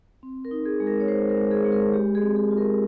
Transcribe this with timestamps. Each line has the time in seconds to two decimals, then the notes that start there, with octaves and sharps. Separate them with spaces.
0.23 C4
0.45 A#4
0.51 D#4
0.65 G#4
0.80 G#3
0.87 A#4
1.00 C#5
1.08 G#3 C5
1.29 A#4
1.37 G#3
1.51 G#4
1.65 G#3
1.72 A#4
1.93 G#3 G4
2.15 G#4
2.22 C4
2.36 G#4
2.51 F4
2.58 A#4